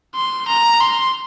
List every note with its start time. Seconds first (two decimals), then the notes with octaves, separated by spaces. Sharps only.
0.15 C6
0.48 A#5
0.81 C6